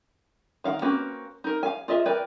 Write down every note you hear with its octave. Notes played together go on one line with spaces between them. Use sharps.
D#3 F5 F#5
A#3 C4 C#4 F#4 B4
D#4 A#4
F5 G#5
F4 G#4 D#5 E5
A#4 B4 D5 G5 G#5